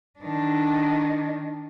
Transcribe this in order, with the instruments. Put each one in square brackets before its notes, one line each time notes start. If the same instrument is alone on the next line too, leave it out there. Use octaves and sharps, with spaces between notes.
[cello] D#3 D4